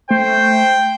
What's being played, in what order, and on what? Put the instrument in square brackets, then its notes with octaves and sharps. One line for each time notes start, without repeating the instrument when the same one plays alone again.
[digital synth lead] A3 [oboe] C5 [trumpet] G5